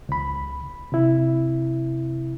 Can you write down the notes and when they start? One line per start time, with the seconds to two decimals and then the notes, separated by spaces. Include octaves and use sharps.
0.09 C#2 B5
0.92 C3 E4